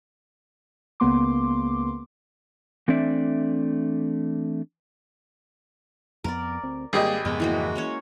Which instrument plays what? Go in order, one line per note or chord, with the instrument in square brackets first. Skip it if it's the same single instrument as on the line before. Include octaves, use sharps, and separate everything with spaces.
[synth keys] C#2 C#3 A#3 B3 C6 D6
[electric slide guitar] E3 A3 C4 D4 D5 E5
[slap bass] F2 A#3 B3 [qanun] A#4 D5
[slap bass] D2 C4
[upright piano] G#1 G4 D#5 [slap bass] G3 A3 A#3 [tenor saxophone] G#4
[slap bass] F2 G#2 C#3 [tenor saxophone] G#3 [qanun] B3
[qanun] E3 A#3 F#4
A#3 C#4 C#5